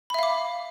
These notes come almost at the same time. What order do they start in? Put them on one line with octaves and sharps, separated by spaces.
B5 E5 F5 D6